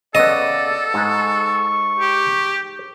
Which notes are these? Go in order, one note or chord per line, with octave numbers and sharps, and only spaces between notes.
C#3 B3 A4 D5 D#5
G#2 G#3 A#5 C#6
G4